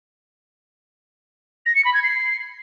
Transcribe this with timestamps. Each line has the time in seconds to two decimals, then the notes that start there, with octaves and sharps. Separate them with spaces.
1.66 A#6
1.75 C#7
1.84 B5
1.93 G#6
2.03 C7